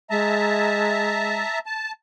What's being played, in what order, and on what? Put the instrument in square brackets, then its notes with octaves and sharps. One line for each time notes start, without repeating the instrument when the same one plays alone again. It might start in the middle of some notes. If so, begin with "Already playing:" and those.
[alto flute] G#3 [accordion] E5 A5 A#5
[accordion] A5